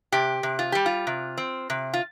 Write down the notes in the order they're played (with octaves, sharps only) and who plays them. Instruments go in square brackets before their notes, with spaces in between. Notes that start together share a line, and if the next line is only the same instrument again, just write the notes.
[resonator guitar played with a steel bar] C3 G4
C3
F4
G3 G4
F4
C3
C4
C3
F4